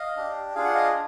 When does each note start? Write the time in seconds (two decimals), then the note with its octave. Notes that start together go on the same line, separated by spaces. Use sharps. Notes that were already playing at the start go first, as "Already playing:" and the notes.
Already playing: D#5 F5
0.17 D4 G4
0.55 D4 F4 G#4 F5
0.65 F#5
0.74 D#5 F5